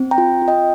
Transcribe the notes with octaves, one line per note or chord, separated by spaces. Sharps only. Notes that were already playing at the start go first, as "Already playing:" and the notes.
Already playing: C4
G5 A#5
F4
F4
D#5 G5